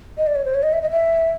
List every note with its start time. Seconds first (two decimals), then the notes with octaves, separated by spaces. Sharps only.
0.17 D#5
0.27 D5
0.35 C#5
0.45 C5
0.54 C#5
0.63 D#5
0.73 E5
0.82 D#5
0.91 E5